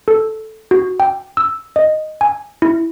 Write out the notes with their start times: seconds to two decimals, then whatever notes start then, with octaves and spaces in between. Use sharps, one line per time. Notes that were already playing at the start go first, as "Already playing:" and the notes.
0.08 A4
0.71 F#4
1.00 G5
1.37 E6
1.76 D#5
2.21 G#5
2.62 E4